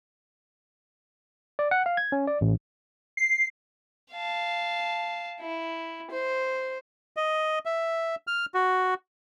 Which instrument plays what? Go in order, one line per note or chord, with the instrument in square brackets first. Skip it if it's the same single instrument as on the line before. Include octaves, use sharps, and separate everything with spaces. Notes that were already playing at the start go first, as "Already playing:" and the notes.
[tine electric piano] D5
F#5
F5
G#6
C#4
D5
A1
[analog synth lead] C7
[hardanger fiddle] F5 A5
E4
C5
[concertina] D#5
E5
F6
F#4